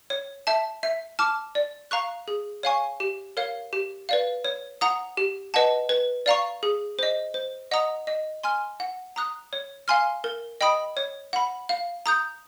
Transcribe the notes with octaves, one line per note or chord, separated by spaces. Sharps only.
C#5
E5 A5
E5
A5 D6 F6
D5
F5 A#5 C#6 F#6
G#4
C#5 F5 G#5 C#6
G4
A#4 C#5 F5
G4
B4 D5 F5
C#5
F#5 A#5 D#6
G4
B4 D#5 F#5 A5
B4
D5 F5 A#5 C#6
G#4
C5 D#5
C5
D#5 F#5 A#5 D#6
D#5
G#5 C6 F6
F#5
A#5 D#6 F#6
C#5
F5 G#5 C6 F6
A#4
D#5 G5 B5 D#6
C#5
F#5 B5
F5
A#5 D#6 G6